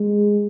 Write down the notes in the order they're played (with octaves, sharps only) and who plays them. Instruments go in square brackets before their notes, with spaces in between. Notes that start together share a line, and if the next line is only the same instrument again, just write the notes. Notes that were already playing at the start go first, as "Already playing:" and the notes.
Already playing: [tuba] G#3